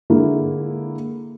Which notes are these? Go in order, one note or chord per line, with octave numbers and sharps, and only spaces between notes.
D3 G#3 A#3 E4